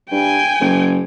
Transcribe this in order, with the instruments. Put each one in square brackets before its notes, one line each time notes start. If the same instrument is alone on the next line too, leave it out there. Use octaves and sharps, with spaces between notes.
[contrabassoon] G2 [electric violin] G5 G#5
[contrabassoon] F#1